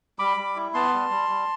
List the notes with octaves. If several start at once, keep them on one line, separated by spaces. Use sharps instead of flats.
G3 B5 D6
G3
E4
B3 A5 C6
G3
G3
G3